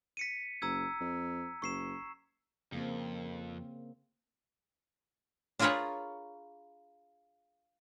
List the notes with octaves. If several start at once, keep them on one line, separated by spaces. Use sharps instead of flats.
B6 C#7 D#7
F#1 A#5 E6 G#6
F2
F#1 C#6 C7 E7
F2 C#3 A#3 C4
D4 F4 G#4 A#4 B4 C#5